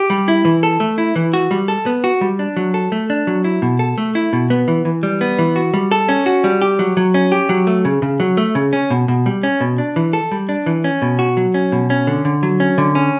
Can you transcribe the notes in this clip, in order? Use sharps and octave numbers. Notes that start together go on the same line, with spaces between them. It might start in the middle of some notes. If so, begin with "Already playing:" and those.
Already playing: G4
G3
E4
E3
A4
A3
E4
E3
F#4
G3
A4
B3
F#4
G3
D4
F#3
A4
A3
D4
F#3
E4
B2
A4
A3
E4
B2
B3
E3
E3
G3
B3
E3
F#4
G3
A4
C#4
F#4
G3
G4
F#3
F#3
C#4
G4
F#3
A3
C#3
C#3
F#3
A3
C#3
C#4
B2
B2
G3
C#4
B2
D4
E3
A4
G3
D4
E3
C#4
B2
F#4
F#3
C#4
B2
C#4
D3
D3
F#3
C#4
D3
C#4